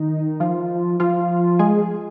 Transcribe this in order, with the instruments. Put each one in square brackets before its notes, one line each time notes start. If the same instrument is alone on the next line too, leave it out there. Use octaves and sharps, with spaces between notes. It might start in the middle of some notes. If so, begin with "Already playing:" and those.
Already playing: [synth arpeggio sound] D#3 D#4
F3 F4
F3 F4
G#3 G#4